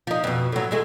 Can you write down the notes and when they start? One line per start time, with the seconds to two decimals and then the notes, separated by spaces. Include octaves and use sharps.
0.07 F3 D#4
0.24 F2 B2
0.52 A2 F#3
0.71 E2 G#3 A3